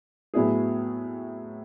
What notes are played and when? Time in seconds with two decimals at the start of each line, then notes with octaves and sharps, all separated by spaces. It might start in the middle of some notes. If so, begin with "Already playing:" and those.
0.34 A2 F#3 B3 E4 G#4